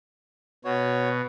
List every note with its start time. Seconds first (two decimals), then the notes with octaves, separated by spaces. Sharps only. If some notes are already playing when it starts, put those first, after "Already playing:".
0.65 B2 F#4 C#5